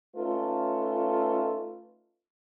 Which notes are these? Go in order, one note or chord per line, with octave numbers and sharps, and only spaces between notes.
A3 C#4 D#4 F4 A4 B4